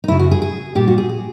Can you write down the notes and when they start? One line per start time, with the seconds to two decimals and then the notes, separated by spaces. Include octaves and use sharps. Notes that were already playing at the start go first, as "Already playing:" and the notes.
0.04 D#4
0.08 F#2 C#3 F#3 E4
0.19 F#4
0.31 G#4
0.42 G#4
0.75 A#2 G3 G4
0.88 F#4
0.98 G#4
1.09 G#4